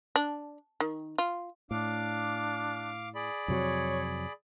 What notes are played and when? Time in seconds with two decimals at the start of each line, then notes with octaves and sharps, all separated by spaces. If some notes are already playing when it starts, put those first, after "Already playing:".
0.16 D4
0.80 D#3
1.18 F4
1.71 A2 D4 F5 D6
3.15 G#4 D5 B5
3.48 F2 C3 F#3 C#5